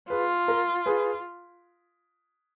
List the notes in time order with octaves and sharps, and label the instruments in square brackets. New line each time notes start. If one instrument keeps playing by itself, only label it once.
[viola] F4 [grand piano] G#4 B4
[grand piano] A#4
G#4 B4